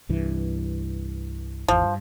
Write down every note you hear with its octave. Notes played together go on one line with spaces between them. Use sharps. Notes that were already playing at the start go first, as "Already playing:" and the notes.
C2 G2 E3
G#1 E2 F3
G2